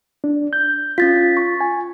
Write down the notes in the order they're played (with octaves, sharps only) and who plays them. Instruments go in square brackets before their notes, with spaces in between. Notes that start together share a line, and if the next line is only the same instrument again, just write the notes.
[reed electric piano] D4
G6
[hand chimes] C#4 A6 B6 [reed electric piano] F4
[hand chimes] C#6
[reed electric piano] G#5